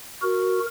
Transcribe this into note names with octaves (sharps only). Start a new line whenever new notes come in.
F#4 A#4